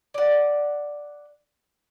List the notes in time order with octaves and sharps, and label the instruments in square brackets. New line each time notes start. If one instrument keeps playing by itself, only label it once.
[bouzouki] D5 F#5